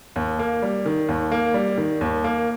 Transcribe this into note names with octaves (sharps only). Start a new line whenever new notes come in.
D#2
A#3
G3
D#3
D#2
A#3
G3
D#3
D#2
A#3